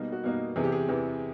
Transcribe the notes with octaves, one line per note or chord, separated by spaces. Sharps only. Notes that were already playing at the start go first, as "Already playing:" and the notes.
Already playing: B2 G3 A#3 D#4
F#4
B2 G3 A#3 D#4
E2 C3 E3 G#4
G4
G#4
E2 C3 E3